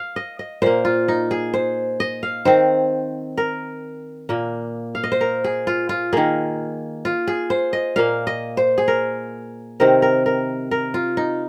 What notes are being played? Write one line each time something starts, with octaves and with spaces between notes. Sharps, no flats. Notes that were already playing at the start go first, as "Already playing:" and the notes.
Already playing: F5
D#5
D#5
A#2 A#3 C5
F4
D#4
G#4
C5
D#5
F5
D#3 C4 C5
A#4
A#2 A#3
F5
D#5
C5
A#4
G#4
F4
F4
D#3 A#3 G#4
F4
G#4
C5
D#5
A#2 A#3 F5
D#5
C5
G#4
A#4
C3 D#3 C4 A#4
A#4
A#4
A#4
F4
D#4